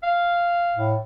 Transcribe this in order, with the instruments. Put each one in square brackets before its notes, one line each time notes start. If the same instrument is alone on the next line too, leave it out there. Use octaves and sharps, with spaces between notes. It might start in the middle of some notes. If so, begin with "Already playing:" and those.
[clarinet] F5
[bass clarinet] A2